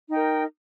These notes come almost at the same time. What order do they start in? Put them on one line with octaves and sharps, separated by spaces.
D#4 G5 A#4